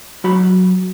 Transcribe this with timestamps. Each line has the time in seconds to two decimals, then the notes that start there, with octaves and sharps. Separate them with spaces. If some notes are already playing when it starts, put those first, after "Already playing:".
0.24 F#3 F#4 B5